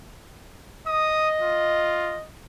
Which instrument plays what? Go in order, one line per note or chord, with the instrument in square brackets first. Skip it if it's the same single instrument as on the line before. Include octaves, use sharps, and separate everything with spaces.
[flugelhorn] D#5 [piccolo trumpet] D#6
[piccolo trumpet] F4